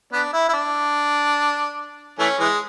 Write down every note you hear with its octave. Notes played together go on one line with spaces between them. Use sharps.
B3 D4
E4
E4
D4
E3 A3 C#4
E3 G#3